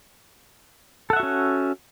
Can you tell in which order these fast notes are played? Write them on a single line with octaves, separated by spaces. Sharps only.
A4 F#5 E5 F#4 C#4